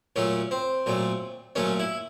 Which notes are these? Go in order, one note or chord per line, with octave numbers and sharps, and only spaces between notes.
A#2 F#3 A3 C#4
C4
A#2 F#3 A3
A#2 F#3 A3 C#4
E4